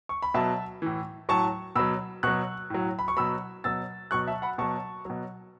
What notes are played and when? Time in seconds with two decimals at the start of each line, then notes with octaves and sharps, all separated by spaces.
0.09 C#6
0.22 B5
0.34 B2 F#3 E5 A5
0.82 A2 E3
1.29 A2 F#3 A5 C#6
1.76 B2 F#3 B5 E6
2.23 B2 F#3 C#6 F#6
2.70 A2 F#3
2.99 B5
3.08 C#6
3.17 B2 F#3 B5 E6
3.64 B2 F#3 E6 A6
4.11 B2 F#3 C#6 F#6
4.27 E5 A5
4.42 F#5 B5
4.58 B2 F#3 A5 C#6
5.05 B2 F#3